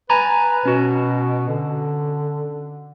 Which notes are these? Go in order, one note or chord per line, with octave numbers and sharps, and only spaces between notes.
B4 G#5 A#5 B5
B2 C#4 F#4
D3